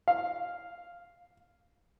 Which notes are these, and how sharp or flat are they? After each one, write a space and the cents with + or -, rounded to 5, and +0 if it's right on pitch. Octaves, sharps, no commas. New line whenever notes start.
F5 -5